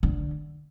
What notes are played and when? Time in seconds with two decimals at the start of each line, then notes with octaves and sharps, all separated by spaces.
0.03 D3